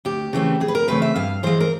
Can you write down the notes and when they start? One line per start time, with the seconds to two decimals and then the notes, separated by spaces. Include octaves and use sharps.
0.05 D2 G4
0.33 C#3 E3 A3 C4
0.60 D2 G#4
0.68 B4
0.75 A#4
0.88 C#3 E3 A3 C4 B4
1.02 E5
1.15 G2 F5
1.43 E3 G#3 C5
1.60 A#4